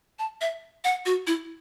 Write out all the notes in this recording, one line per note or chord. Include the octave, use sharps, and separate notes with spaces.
A5
E5
F#5
F#4
E4